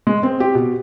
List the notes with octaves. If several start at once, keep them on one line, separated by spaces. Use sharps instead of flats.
G#3
C4
G4
B2